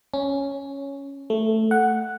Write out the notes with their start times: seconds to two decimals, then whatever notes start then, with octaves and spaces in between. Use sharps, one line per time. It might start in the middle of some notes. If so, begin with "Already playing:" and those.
0.14 C#4
1.30 A3
1.71 F#5